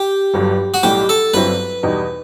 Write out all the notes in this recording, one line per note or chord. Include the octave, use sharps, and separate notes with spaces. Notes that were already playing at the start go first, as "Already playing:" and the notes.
Already playing: G4
G1 G2 F#3
F#4
B1 A2 G3 G4
A4
G1 G2 F#3 C4 E4 B4
E2 B2 G3 D#4